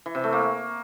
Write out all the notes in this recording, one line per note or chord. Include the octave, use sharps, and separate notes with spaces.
E3
C3
A3
A#3